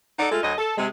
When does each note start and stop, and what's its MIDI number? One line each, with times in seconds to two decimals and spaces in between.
0.19 0.28 63
0.19 0.28 69
0.19 0.28 74
0.19 0.28 78
0.31 0.42 56
0.31 0.42 57
0.31 0.42 65
0.31 0.42 69
0.43 0.53 38
0.43 0.53 54
0.43 0.53 75
0.58 0.73 69
0.78 0.87 48
0.78 0.87 56